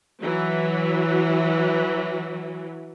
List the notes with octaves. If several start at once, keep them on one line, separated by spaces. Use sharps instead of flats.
E3 F#3